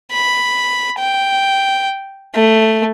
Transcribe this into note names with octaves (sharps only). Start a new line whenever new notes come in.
B5
G5
A3